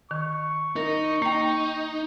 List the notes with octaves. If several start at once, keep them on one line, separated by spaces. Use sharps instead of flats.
D#3 C#6
D#4 A#4
A#3 D#4 G5